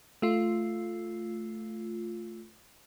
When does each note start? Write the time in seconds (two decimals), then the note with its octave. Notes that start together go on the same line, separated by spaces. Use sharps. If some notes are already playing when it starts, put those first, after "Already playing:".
0.22 A3 F4